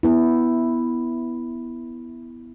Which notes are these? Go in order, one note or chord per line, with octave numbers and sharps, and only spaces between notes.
B3 E4